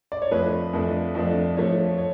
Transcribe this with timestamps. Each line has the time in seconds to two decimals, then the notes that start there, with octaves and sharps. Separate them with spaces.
0.12 D5
0.22 C#5
0.31 F2 F3 A3 D4 B4
0.73 F2 F3 A3 D4
1.15 F2 F3 A3 D4
1.56 F2 F3 A3 D4 C#5
1.98 C#5